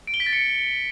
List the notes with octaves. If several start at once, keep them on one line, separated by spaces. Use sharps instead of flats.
D7
G7
B6
A6
C#7